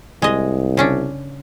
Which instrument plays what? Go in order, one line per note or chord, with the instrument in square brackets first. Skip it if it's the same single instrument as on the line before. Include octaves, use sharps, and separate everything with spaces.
[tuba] C2 [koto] G#3 D#5
[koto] C#3 C#4 D4